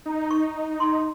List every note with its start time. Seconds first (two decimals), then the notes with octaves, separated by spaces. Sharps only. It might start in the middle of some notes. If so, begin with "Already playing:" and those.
0.06 D#4
0.31 C#6
0.80 C6